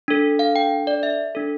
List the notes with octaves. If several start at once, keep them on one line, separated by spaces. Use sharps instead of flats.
D4 A4
F5
G5
D5
E5
D4 A4